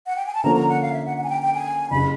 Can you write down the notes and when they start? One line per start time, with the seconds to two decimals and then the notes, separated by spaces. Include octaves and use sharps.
0.06 F#5
0.16 G5
0.26 G#5
0.34 A5
0.44 D3 F3 A#3 C#4 A#5
0.56 A#5
0.69 F#5
0.82 F5
0.92 E5
1.06 F#5
1.18 F#5
1.24 G#5
1.30 G5
1.42 G5
1.54 G#5
1.90 F#1 C#3 B5